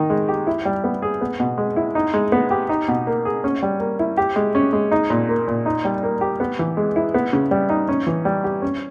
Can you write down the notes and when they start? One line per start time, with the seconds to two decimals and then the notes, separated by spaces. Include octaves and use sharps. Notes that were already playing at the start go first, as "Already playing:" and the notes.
Already playing: D#3 D#4
0.10 G#3
0.28 G4
0.47 E4
0.65 G3
0.84 B3
1.02 G#4
1.21 B3
1.40 B2
1.58 G#3
1.76 E4
1.95 D#4
2.14 G#3
2.32 B3
2.51 G4
2.69 D#4
2.88 B2
3.07 A#3
3.25 G#4
3.44 C#4
3.62 G3
3.80 A#3
3.99 E4
4.17 G4
4.36 G#3
4.55 C#4
4.73 G#3
4.92 D#4
5.10 A#2
5.29 A#3
5.48 A#2
5.66 D#4
5.85 G3
6.03 A#3
6.21 G4
6.40 B3
6.59 E3
6.77 G#3
6.96 E4
7.14 B3
7.33 C#3
7.51 G3
7.69 D#4
7.89 C#4
8.07 E3
8.25 G3
8.44 G4
8.62 C#4